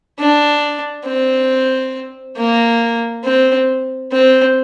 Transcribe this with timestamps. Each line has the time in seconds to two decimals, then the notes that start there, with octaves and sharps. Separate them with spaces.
0.19 D4
1.06 C4
2.37 A#3
3.25 C4
4.12 C4